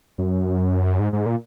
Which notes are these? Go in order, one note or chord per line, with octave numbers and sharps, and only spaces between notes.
F#2
G#2
G#2
A#2